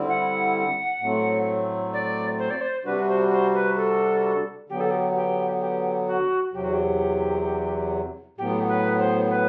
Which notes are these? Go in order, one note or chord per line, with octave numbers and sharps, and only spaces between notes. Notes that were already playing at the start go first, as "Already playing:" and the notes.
Already playing: D3 G3 C4 E4
F#5
A2 F#3 A3 C4
D5
C5
D5
C5
C3 G3 D4 F#4 B4
C5
C5
B4
A4
D3 F#3 B3 G4
A4
G4
G4
G4
F#4
E2 C3 F#3 G4
F#4
G4
A2 F#3 B3 G4
B4
C5
B4